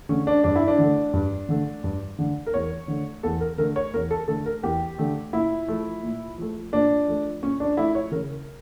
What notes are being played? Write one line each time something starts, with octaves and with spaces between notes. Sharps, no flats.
D3 A3 C#4
D4
G2 D4
E4
D4
D3 A3
G2
D3 A3
G2
D3 A3
A#4
E2 C#5
D3 A3
E2 A4
A#4
D3 A3 A#4
C#5
E2 A#4
A4
D3 A3 A4
A#4
E2 G4
D3 A3
A#2 E4
F3 A3
A#2
F3 A3
A#2 D4
F3 A3
A#2 C#4
D4
F3 A3 E4
C#5
C#3 A#4